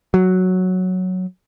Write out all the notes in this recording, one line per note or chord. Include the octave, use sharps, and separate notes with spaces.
F#3